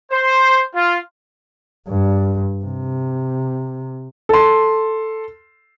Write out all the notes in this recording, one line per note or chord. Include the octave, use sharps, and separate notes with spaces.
C5
F4
G2
C3
A4 C6